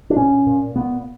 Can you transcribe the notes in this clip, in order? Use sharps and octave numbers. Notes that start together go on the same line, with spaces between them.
D4
A#2 C#4
A#2
A#2 B3